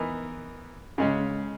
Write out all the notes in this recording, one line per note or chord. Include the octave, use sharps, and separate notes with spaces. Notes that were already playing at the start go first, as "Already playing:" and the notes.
Already playing: E3 B3 D#4 A#4
C#3 G#3 C#4